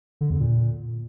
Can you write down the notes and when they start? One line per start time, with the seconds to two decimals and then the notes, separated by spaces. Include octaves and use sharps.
0.21 D3
0.30 E2
0.40 A#2